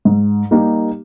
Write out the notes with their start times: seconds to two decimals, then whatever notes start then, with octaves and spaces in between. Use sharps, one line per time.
0.05 G#2
0.51 G3 A#3 D#4 G4